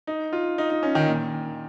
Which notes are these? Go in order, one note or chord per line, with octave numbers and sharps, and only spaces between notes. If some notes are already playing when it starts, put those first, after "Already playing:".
D#4
F4
D#4
D#4
C#4
D#3
A#2